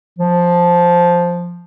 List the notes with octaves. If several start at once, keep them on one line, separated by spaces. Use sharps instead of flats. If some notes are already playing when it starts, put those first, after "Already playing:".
F3